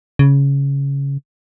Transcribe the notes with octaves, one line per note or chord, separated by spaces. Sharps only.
C#3